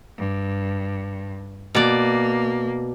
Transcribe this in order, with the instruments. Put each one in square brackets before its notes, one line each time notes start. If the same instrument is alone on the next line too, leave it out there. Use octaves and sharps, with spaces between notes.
[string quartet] G2
[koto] B2 D5 [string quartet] A#3